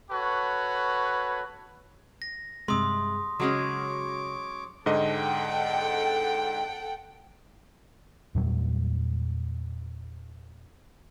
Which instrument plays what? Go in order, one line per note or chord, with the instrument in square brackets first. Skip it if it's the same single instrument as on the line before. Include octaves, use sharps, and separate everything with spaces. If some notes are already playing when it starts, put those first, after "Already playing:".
[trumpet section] F#4 A4 B4 C#5
[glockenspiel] A#6
[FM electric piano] G2 G#3 [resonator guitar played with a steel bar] C3 [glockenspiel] C6 D#6
[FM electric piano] C#3 F#4 [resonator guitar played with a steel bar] F#3 G#3 C#4 [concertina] C#5 D6
[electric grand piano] G#2 D3 D#5 [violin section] A4 F#5 G5
[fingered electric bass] E2 A#2 F#3 G3